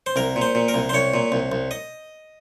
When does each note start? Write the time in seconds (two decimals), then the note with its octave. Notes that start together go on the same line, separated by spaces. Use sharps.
0.06 C5
0.16 C2 A#4
0.36 A#2
0.41 C5
0.55 A#2
0.68 A#4
0.74 C2
0.89 C5
0.93 C2 C#5
1.14 A#2
1.32 C2
1.52 C2
1.71 D#5